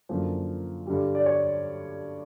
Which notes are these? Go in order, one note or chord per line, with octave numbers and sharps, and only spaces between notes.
F#2 D3 F3 A#3
G2 D3 G3
D5
C#5